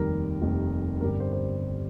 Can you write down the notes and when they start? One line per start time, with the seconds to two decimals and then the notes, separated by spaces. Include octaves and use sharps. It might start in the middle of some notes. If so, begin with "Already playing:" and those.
Already playing: F1 D#2 D#3 G3 A#4
0.42 F1 D#2 D#3 G3
1.01 G1 G2 D3 G3 A#4
1.20 C5
1.33 C5